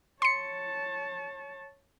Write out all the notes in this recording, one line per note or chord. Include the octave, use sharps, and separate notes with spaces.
C#5 A5 C6 C#7